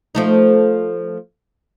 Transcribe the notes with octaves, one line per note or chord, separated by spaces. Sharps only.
F3 A3 D#4